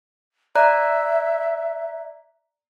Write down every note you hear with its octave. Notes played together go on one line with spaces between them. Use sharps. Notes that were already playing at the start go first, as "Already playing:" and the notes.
D5 E5 A#5 F#6